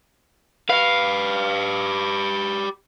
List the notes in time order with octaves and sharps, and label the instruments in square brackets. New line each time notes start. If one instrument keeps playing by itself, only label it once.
[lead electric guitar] G4 B4 [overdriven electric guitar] F5